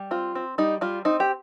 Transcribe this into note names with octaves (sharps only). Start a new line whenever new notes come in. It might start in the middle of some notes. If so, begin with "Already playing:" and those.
Already playing: G3
C4 F4
C4
G3 D#4
G3 F4
C4 D#4
G4